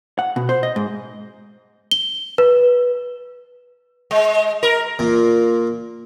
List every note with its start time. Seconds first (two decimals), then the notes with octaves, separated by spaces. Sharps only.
0.19 F#5
0.36 B2
0.49 C5
0.63 D#5
0.76 G#2
1.91 G7
2.38 B4
4.11 G#3
4.63 A#4
4.99 A#2